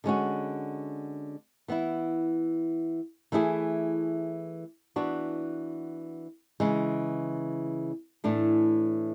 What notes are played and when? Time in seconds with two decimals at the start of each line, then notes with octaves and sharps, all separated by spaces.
0.04 D3 G#3 C#4 F#4
1.68 E3 B3 E4
3.32 E3 A3 E4 G#4
4.96 E3 B3 D4 F#4
6.60 C#3 E3 G#3
8.24 A2 E3 A3 D4